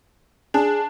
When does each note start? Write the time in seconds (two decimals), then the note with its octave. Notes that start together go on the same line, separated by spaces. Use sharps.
0.54 D4 G#4